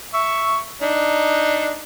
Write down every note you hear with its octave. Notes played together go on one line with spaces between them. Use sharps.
E5 C#6
D4 D#4